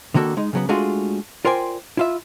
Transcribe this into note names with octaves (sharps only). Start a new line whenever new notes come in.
D3 D#3 A#3 F#4 A4
G#3 D#4
C#3 F#3 B3
G#3 A3 D4 F4 F#4 G#4
F4 A#4 C5 D5 G5 G#5
E4 F4 E5